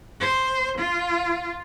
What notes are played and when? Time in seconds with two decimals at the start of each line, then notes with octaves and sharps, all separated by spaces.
0.20 C5
0.78 F4